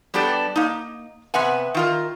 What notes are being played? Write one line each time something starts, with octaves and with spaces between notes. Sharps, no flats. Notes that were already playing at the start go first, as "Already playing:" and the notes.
G3 B3 D4 G4 A4 D5
A#3 D#4
C3 B3 E5 F#5 G#5
D#3 F4 A#4